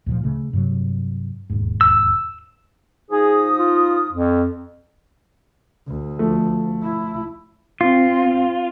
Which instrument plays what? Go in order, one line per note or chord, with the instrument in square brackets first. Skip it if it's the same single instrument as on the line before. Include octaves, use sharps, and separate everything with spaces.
[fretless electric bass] D2 A#2 F3
C#3 A3
G2 C3 F#3
E1 D#2 G#2
[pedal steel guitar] E6
[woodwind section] F3 D#4 D#6 [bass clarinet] G#4
[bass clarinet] F4
F2
[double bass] D2
[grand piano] F3 A3
[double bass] E4
[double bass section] C4 [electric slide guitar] F4